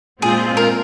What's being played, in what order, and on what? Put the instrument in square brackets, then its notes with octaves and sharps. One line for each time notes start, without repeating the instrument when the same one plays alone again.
[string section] A#2 G#3 C4 F4 C5 [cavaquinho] G#4
[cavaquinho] A#4